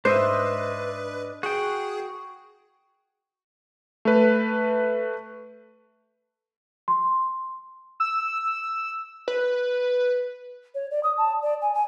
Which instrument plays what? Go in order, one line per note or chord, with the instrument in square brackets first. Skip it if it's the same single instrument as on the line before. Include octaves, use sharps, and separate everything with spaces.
[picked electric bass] G#2 [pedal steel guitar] D4 D#5 E5 [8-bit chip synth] B4 [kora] C5
[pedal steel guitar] F#4 G5 [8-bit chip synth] G#4
[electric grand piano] A3 B4
[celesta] C6
[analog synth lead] E6
[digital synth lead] B4
[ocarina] C#5
D5
D#6
A5
D5
G#5
G#5